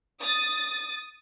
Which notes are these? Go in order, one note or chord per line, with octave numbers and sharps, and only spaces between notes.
D#6 A6